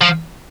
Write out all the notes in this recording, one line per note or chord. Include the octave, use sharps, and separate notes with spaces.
F3